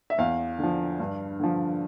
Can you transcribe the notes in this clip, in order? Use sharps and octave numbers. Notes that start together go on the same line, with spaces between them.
E5
E2 F5
D3 F3
G2
D3 F3